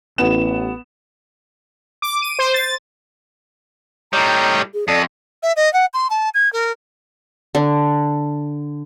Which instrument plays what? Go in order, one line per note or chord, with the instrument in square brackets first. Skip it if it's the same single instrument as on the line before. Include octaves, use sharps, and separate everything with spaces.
[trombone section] A1 [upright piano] B3 E7
[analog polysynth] D6
D#7
C5
A6
[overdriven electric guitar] A2 G3 [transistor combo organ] C#5 D#5 G5 [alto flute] A#5
[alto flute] G#4
[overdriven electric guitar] F2 [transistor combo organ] A4 D#6 [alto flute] D5
[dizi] E5
D#5
F#5
C6
A5
G#6
A#4
[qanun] D3